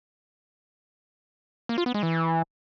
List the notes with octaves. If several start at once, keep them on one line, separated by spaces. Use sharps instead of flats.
A#3
F4
B3
G#3
E3